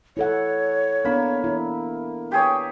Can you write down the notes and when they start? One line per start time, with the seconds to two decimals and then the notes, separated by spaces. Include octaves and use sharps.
0.17 E4 A4 C#5 F#5
1.05 A#3 B3 D4 B5
1.44 E4
2.32 G4 G#4 C#5 G5